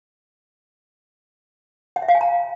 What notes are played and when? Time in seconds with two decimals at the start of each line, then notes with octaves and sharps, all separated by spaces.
1.96 F#5
2.02 E5
2.08 F5
2.15 G#5
2.21 A#5